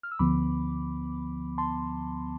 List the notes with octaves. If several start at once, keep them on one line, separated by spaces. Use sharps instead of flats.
F6
E6
D2 D3 F3 B3 B5 D6
A5 C6